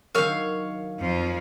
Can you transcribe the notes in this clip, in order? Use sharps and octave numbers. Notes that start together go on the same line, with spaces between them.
D#3 F#3 D4 A#4 C#5 F5
F2 F3